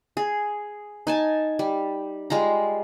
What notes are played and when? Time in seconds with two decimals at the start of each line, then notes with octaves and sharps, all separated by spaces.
0.17 G#4
1.07 D#4 G#5 A5
1.59 G3
2.30 G3 G#3 F4 A#5